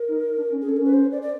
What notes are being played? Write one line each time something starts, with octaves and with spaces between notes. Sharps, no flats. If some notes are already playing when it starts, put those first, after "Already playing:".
Already playing: A#4
D#4
D4
C#4
G#4
C#4
A4
C#4 A#4
B4
C5
D5
D5